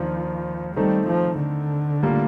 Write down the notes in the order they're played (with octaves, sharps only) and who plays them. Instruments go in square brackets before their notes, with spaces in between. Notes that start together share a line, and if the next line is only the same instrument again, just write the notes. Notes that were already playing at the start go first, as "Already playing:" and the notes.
Already playing: [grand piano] D#2 D#3 A#3 D4 F4 [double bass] F3
[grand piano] D#3 A3 C4 D#4 A4 [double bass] G3
[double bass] F3
D3
[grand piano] A2 G3 A#3 F4 A4